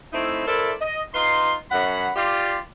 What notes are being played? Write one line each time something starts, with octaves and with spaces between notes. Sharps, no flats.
A3 C4 D#4 E4
E4 A4 A#4 C5 D5 E5
D#5
D#4 F4 B4 C6
F#2 F#5 B5
F4 G4 D5